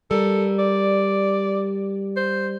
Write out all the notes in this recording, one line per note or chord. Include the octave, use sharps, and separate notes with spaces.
G3 A4 A#4
D5
C5